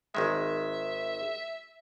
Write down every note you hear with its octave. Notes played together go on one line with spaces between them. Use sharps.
G#1 D#3 G#3 E5